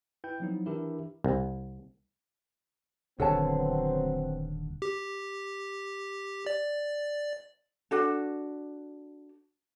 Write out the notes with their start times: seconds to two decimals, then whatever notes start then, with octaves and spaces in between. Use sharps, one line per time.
0.24 E4 B4 G5 G6
0.40 F3 F#3 B3 C4 D#4 E4
0.66 E3 D4 E4 G4 A#4 E5
1.24 C2
3.20 D#1 D3 F#3 B3 C4 A4 C#5 A5
4.82 G4
6.46 D5
7.91 D4 F#4 A4